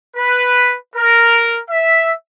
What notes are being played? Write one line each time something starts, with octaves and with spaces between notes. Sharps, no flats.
B4
A#4
E5